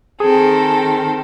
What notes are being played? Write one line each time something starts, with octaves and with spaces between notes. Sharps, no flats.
D#3 C4 G#4 A4